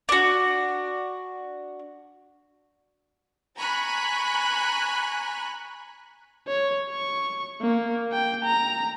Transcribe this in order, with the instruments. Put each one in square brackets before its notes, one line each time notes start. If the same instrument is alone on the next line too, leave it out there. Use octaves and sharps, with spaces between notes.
[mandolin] D4 F#4
[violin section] G#5 A#5 B5 C#6 F#6
[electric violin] C#5
C#6
A#3
G5
A#5